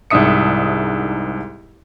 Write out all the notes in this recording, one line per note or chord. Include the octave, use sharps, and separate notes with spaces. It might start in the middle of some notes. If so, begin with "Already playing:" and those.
C2 G#2 D4 E5 D#6 C#7